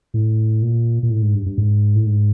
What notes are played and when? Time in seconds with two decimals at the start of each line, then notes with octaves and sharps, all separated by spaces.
0.14 A2
0.62 A#2
1.03 A#2
1.10 A2
1.22 G#2
1.35 G2
1.46 G2
1.58 G#2
1.95 A2
2.06 G#2